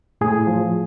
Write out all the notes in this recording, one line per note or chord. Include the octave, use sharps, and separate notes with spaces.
A2 G#4
F3